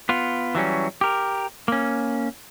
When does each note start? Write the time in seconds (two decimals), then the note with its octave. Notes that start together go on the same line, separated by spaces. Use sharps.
0.09 B3 F4
0.55 E3 F#3 G3 C#4
1.01 G4 A#4
1.68 A#3 C#4